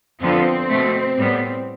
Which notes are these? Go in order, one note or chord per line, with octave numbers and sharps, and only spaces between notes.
F2 D3 F3 B3 C4
B2 A3
A2 G3 B3